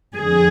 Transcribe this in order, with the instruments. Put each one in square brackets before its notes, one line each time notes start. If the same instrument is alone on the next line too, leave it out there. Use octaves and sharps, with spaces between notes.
[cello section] F2 D3 G#4